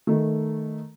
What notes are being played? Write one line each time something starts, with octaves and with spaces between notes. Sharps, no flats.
D#3 A3